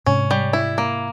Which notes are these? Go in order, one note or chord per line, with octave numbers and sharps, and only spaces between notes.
G#2 C3 C#4
G3
E4
A#3